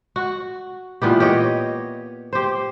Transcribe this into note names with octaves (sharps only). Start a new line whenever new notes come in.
F#4
A#2 E3 B3 G4
G4 C#5 D#5
G4 C5